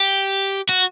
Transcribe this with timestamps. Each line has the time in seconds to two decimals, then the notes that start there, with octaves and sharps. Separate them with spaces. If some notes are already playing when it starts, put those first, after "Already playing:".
Already playing: G4
0.69 F#4